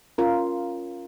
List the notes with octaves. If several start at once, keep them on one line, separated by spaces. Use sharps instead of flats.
C#4 F4 A#4